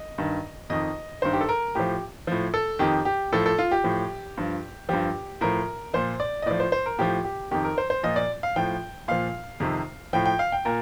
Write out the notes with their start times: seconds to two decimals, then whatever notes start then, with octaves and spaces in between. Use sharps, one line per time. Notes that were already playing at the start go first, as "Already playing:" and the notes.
Already playing: D#5
0.18 G2 D#3
0.70 F2 D#3 D#5
1.22 G2 D#3 C5
1.33 G4
1.41 A4
1.49 A#4
1.75 A2 F3 G4
2.27 A2 F3
2.54 A4
2.79 F2 D#3 G4
3.05 G4
3.32 A2 F3 A4
3.46 A4
3.59 F4
3.71 G4
3.84 A2 F3
4.37 G2 F3
4.89 G2 F3 G4
5.41 A2 F3 A#4
5.94 A#2 F3 C5
6.20 D5
6.42 D#5
6.46 A2 F3 D5
6.60 C5
6.72 C5
6.86 A#4
6.98 A2 F3 G4
7.24 G4
7.51 F2 D#3 G4
7.64 A#4
7.78 C5
7.90 C5
8.03 A#2 F3 D#5
8.16 D5
8.43 F5
8.56 A2 F3 G5
9.08 A#2 F3 F5
9.60 F2 C3 D#3
10.13 A2 F3 G5
10.26 G5
10.39 F5
10.52 G5
10.65 A#2 A#4